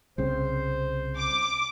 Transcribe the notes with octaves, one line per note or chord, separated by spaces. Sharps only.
C2 C#3 C4 C5
D6